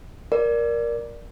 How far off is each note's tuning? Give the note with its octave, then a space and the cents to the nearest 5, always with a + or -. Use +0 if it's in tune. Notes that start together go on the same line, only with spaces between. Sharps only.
A#4 +15 D5 +0